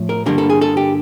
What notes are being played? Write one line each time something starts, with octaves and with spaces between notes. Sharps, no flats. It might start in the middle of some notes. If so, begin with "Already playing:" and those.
Already playing: A2 F3
A#4
G2 D3 G3 A#3 A#4
A4
G#4
A4
G4